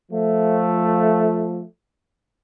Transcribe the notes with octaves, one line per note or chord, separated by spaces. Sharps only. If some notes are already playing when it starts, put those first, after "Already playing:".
F3 A3